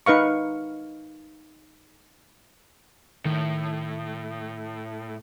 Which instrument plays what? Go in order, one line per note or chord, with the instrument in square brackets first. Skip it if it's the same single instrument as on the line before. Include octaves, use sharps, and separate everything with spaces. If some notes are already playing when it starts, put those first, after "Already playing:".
[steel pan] D#4 B4 F5 C#6
[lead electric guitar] A2 [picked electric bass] D#3